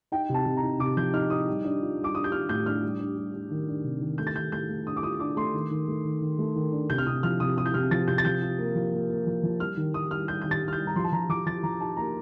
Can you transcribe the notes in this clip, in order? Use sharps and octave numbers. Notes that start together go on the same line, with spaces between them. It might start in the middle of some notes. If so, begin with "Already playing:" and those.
D#4 G5
C3
A5
C3
A#5
D#4
C3 D6
F3 G6
D#4 F6
D#4 D#6
G3
D4
F4
G3
D6
D4 D#6
G6
F4 F6
A2 G6
D4 F6
G3
D4
G3
D4
D#3
D4
C3
D#3
A3 G6
A6
D#3 G6
A3 G6
A3
D4 D#6
D6
F4 D#6
D4 D6
A3 C6
D#3
D#3
A3
D#3
D#3
A3
D#3
D4
C3 G6
F6
C3 D#6
F3 F6
C3 D#6
C3 D#6
G6
C3 F6
F3 A6
C3 G6
A6
F3 G6
F4
A#3
F3
A#3
A#3
F3
F3
G3 F6
D#3
D#3 D#6
G3 F6
G3 G6
D#3 G6
A6
G3
F6
G6
G3
A#5
F3 C6
A5
F3 A#5
F3 D6
F3 A6
F3 A#5
D#4 A5
A#3 A#5